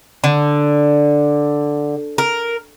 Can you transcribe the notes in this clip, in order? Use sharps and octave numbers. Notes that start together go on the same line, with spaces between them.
D3
A#4